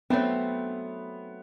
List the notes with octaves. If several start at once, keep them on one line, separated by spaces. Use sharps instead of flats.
F#3 A3 B3 C4